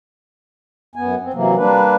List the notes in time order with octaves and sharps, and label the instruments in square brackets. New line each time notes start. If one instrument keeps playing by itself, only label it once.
[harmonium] F#2 B3 G#5
C4
C3 E3 F#3 A#3
G3 A#3 D4 B4